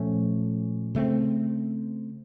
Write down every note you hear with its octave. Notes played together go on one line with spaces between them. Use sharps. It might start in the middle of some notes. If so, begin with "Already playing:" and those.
Already playing: A#2 F3 A3 C#4
C#3 A3 C4